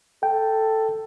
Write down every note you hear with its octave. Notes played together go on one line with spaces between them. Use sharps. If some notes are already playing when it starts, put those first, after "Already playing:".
A4 G5